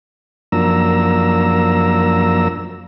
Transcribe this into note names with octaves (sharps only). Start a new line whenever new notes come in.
F#2 F3 A#3 D4 A#5 E6